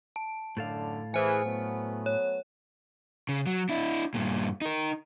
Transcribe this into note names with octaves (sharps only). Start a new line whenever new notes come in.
A5
F#2 A2 D3 A4 F5
E3 G#4 C5 G#5
F#3 A3 B3
C#5
C#3
F#3
D4 E4
G2 A#2
D#4 A#4